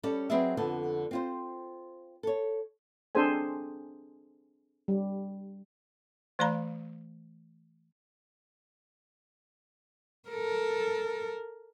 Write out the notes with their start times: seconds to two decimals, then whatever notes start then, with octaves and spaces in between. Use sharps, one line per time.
0.03 G3 C#4 A4 D5
0.30 F#3 C4 G#4 B4 D5 E5
0.57 F2 D3 B3 A4
1.11 C4 F4 C5
2.23 A4 C#5
3.15 C4 D4 G#4 A4 C5 G#5
4.88 G3
6.39 E3 A3 D5 F5 A#5 B5
10.29 A4 A#4